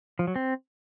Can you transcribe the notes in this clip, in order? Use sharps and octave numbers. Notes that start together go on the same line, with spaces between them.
F3
F#3
C4